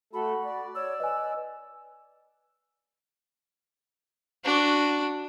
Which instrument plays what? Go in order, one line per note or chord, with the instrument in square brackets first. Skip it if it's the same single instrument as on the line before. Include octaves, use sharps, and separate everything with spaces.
[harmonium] A3 A4 [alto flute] F#4 [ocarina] B5
[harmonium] D5
[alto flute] C#5 [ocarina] E6
[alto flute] B4 [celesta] D#5 G#5
[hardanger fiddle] D4 F#4